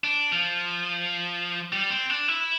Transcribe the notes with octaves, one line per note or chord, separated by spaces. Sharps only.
D4
F3
G3
C4
D4
E4